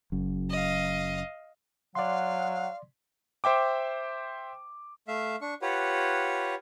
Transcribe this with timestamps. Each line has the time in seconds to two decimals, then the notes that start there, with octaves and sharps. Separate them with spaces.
0.12 F#1 F#2
0.50 D#5 F5
1.95 F#3 D5 F5 F#5 C6
3.44 C5 E5 G5 D6
5.08 A3 E5 F5
5.41 D4 C#6
5.62 F4 G4 B4 C#5 F#5